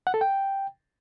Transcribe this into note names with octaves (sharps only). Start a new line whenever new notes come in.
F#5
A4
G5